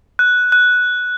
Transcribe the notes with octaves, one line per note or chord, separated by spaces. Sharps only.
F#6
F#6